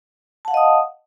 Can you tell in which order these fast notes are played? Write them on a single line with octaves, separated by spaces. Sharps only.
A5 F#5 F5 D#5 D#6